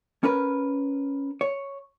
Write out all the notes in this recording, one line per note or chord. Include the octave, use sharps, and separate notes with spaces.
C#4 A#4 B4
C#5